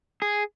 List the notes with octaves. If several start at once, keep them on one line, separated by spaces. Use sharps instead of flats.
G#4